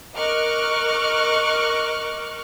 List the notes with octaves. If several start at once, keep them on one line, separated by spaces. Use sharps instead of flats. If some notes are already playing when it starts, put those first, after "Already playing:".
A#4 D#5 C#6 D6 F6 F#6